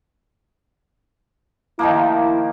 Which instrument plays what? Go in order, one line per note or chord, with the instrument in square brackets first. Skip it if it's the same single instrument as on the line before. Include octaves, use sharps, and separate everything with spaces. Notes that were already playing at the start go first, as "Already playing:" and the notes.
[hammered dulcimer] D#3 F3 A#3 [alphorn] E4